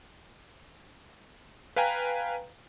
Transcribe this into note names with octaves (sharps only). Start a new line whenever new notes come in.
B4 F5 G5 G#5 A#5